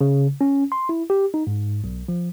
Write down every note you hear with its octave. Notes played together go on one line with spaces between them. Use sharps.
C#3
C#4
C6
E4
G4
D#4
G#2
B1
F3